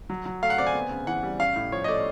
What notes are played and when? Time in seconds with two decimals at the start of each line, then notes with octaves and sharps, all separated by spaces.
0.10 F#3
0.26 F#3
0.42 A3 F5
0.50 F#5
0.58 C4 D5
0.67 G#5
0.75 B3
0.91 C#3
1.07 E3 F#5
1.23 G3
1.39 C#4 F5
1.56 A2
1.72 F3 C#5
1.84 D#5
1.88 A3 D5